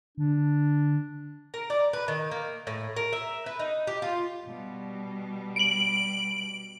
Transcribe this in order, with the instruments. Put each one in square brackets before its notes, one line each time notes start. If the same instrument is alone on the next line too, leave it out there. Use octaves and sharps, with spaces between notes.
[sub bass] D3 [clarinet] D4
[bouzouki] A#4
D5
B4
D#3
A#3
A2
A#4
E5
B4
D#4
G4
F4
[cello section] B2 G3
[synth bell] D7 F#7